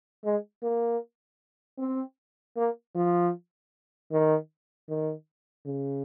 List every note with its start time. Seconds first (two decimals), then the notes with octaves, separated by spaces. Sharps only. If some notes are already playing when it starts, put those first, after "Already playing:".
0.24 G#3
0.63 A#3
1.79 C4
2.57 A#3
2.95 F3
4.12 D#3
4.89 D#3
5.66 C#3